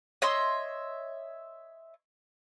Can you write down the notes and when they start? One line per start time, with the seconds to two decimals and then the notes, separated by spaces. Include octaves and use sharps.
0.22 C#5 D#5 E5 C6